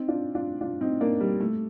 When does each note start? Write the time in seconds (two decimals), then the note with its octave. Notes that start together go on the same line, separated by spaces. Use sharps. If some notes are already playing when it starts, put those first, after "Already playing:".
Already playing: C4 D#4
0.08 D4 F4
0.35 D4 F4
0.61 D4 F4
0.81 C4 D#4
1.01 A#3 D4
1.21 G3
1.40 A3